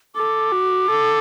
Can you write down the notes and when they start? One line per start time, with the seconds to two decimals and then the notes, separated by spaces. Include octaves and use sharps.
0.15 A4 D6
0.52 F#4
0.90 A4